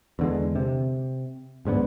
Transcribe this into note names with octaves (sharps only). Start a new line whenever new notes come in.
E2 D3 G#3
C3
D1 G#2 D3 B3